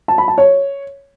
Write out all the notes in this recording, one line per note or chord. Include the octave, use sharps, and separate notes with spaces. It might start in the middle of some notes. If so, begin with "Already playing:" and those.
A5
B5
A5
C#5